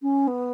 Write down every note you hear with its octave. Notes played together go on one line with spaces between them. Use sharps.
C#4
B3